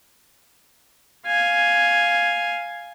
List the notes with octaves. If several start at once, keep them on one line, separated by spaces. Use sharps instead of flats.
F5 G#5